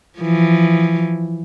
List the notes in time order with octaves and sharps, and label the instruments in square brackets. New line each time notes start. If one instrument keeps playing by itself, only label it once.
[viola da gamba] E3 F3